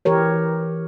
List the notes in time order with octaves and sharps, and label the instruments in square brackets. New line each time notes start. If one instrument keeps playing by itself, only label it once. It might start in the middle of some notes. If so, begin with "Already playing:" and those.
[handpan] E3 G4 A#4 C#5